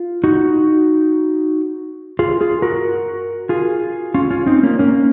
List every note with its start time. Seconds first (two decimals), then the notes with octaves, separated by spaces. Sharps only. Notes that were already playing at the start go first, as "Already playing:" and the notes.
Already playing: F4
0.24 D#4 F#4
2.19 F4 G#4
2.41 F4 G#4
2.62 F#4 A#4
3.49 F4 G#4
4.14 C#4 F4
4.30 C#4 F4
4.46 C4 D#4
4.63 A#3 C#4
4.79 A#3 C#4